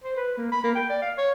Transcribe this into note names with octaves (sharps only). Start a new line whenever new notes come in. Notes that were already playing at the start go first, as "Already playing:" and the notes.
C5
B4
A#3
B5
A#3
G5
D5
F5
C#5